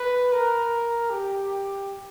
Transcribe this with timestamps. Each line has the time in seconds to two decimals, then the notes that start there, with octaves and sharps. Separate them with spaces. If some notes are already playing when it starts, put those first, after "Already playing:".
Already playing: B4
0.33 A#4
1.10 G4